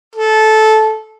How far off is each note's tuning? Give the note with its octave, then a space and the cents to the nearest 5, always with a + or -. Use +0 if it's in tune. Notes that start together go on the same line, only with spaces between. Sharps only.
A4 -15